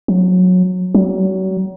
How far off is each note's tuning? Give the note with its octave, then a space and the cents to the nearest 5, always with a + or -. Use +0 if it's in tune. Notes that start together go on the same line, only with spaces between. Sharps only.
F#3 -20
F#3 +35